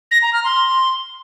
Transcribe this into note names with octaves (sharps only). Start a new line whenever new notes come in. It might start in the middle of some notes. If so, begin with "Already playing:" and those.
A#6
A#5
F6
C6